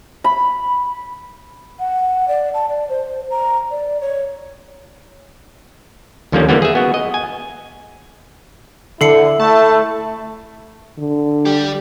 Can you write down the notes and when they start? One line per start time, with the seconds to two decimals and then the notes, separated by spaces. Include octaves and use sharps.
0.24 B5
1.79 F#5
2.28 D5
2.54 A5
2.69 D5
2.89 C5
3.31 A#5
3.71 D5
4.01 C#5
6.32 D#2 D3 F3 G3 A#3 C#4
6.49 D3 E3 G3 A#3 B3
6.62 G#4 E5
6.75 B3 F#4
6.94 D#5
7.14 G#5
9.01 D3 E4 A4 C7 C#7
9.40 A3 A5
10.99 D3
11.45 G3 G4